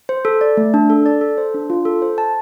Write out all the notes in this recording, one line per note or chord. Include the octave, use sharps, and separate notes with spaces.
C5
A4
D5
A3
D4
A4
D5
A4
C5
D4
F4
A4
C5
A5